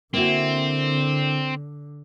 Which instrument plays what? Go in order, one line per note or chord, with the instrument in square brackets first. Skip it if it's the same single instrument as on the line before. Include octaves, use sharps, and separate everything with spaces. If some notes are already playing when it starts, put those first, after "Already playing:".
[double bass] D3 [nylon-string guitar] A#3 E4 F#4 [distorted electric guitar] C4